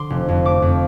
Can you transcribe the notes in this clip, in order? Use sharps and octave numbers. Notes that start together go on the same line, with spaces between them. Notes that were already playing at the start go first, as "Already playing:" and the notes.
Already playing: D3 C6 D6
F1
F2
A3 D6
F2